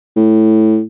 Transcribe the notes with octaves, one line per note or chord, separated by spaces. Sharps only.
A2